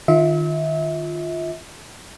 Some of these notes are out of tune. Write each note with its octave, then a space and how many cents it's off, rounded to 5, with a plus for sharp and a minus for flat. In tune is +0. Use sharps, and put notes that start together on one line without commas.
D#3 -20 F4 +0 E5 -35